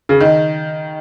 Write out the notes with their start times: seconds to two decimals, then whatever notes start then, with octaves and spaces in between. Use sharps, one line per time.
0.09 C#3
0.21 D#3